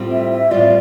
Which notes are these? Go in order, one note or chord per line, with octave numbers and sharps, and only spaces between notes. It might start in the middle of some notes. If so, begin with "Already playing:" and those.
Already playing: A2 G3 C4 F4
E5
E5
A2 G3 C4 F4 D5